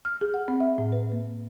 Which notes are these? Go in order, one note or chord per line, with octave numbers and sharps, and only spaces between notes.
F6
G#4
F#5
C4
E5
A2
B4
A#3